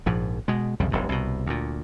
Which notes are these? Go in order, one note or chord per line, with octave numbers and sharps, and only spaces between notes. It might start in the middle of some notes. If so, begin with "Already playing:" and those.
A#1 G#2 F3
B2 G#3
C2 F2 C#3 G3
F1 B1 G2
C2 B2
D2 A#2